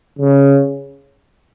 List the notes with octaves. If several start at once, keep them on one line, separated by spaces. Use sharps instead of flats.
C#3